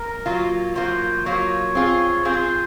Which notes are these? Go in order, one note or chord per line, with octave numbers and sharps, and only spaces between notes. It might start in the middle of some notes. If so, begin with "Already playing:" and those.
Already playing: A#4
F#3 A#3 F4
F#3 A#3 F4 C5
F#3 A#3 F4 C#5
C4 F4 G#4
C4 F4 G#4 C5